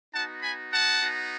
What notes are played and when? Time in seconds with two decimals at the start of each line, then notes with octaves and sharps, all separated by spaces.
0.14 B3 D#4 F#4 F#5 A5
0.42 G#5 B5
0.72 F#5 A5
1.01 B3 D#4 F#4